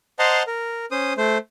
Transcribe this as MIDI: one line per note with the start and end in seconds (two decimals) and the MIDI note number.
0.19 0.43 72
0.19 0.43 75
0.19 0.43 78
0.19 0.43 81
0.19 0.43 82
0.19 0.43 84
0.47 0.86 70
0.91 1.13 61
0.91 1.13 72
0.91 1.13 87
1.17 1.38 57
1.17 1.38 72